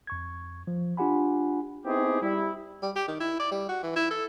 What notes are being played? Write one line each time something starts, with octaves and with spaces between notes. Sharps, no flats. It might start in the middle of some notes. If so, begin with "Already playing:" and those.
F2 C#6 G#6
F3
D4 F4 G4 F#5 G#5 B5
B3 C4 D#4 E4 G4 G#4
G3 E4
G3
G4
D#3
E4
D5
G3
F#4
E3
E4
A4